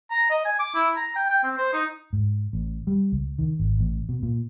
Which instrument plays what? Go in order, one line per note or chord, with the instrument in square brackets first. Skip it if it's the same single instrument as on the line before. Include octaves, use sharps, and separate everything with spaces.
[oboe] A#5
D#5
G#5
D6
E4
A#5
G5
G5
C4
C5
D#4
[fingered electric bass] G#2
A1
G3
C#2
D#3
G#1
A1
B2
A#2